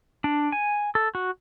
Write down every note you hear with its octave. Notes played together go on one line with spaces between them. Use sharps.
D4
G#5
A4
F#4